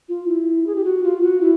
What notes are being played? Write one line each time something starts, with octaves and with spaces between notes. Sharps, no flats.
F4
E4
G#4
G4
F#4
F4
F#4
E4